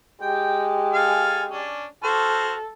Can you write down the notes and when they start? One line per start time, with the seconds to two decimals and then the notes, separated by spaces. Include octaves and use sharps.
0.22 G#3 G4 G5
0.94 A4 F5 G#5
1.51 C#4 D4
2.03 F#4 A4 C5 F6